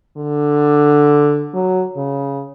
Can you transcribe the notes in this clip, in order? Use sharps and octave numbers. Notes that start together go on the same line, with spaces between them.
D3
F#3
C#3